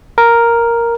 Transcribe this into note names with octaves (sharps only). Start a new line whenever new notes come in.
A#4